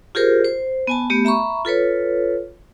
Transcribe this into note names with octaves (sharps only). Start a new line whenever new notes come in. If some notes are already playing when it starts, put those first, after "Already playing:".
F4 G4 G#4 A#4 C5
C5
B3 G#5 A5
A3 B3 G4
E5 A#5 B5 C#6
F4 A4 B4 C#5